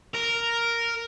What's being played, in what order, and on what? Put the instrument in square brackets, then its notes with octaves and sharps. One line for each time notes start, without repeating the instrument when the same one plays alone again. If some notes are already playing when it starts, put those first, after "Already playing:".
[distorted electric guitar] A#4